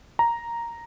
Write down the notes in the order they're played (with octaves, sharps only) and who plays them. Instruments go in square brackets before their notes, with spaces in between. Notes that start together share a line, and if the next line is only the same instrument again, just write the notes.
[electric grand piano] A#5